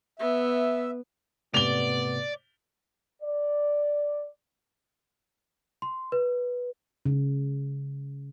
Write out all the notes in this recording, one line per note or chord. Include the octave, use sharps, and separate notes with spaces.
B3 E5
G#2 C3 A3 B3 D5 F7 G7
D5
C6
B4
C#3